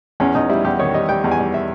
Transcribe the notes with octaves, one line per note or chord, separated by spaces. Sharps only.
E2 C#4
E2 D#4
G3 E4
E2 G4
D#3 C#5
G3 D#5
G3 G5
E2
G#5
G3
E5